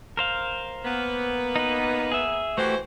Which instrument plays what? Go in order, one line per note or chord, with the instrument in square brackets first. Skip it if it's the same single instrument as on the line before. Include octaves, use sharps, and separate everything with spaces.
[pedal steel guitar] A#4 C5 F5
[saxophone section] A#3 B3
[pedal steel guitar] D#4 B4
G#4 E5
[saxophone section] E3 F#4 C5 [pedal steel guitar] A3 G4